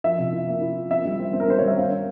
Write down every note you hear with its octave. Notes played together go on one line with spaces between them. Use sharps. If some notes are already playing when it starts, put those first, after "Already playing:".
F3 E5
C3
E4
A#3
E4
F3
C4 E5
G3
C4
C4
A#4
G3 C5
G3 C#5
E5
C4 F5
C4